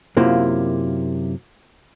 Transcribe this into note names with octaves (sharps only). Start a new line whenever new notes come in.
F#2 C3 A#3 E4 F4